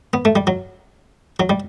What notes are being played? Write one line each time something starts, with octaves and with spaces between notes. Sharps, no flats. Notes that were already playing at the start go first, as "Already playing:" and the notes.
B3
A3
G3
F#3
F#3
G3